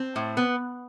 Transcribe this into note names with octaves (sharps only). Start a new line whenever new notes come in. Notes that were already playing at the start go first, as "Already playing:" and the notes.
Already playing: C4
A2
B3